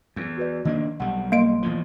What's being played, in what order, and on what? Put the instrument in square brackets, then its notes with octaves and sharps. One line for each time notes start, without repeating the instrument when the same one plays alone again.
[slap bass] E2
[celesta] F#4 B4 D5
[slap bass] D#3 A#3 D4 [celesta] D#5
[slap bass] B1 G3 [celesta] F#5
[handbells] A#3 D7 [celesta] D#5 C6
[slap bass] E2 A2 F3